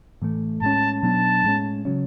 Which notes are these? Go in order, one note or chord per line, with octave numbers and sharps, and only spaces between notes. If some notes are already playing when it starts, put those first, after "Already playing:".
A2 E3 A3
A2 G#3 C#4 A5
B2 F#3 B3 D4 A5
A2 G#3 C#4
C#3 F#3 C#4